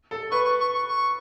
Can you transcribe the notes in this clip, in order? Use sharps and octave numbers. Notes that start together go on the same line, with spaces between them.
A4
B4 C#6
C#6
C#6
C#6
C#6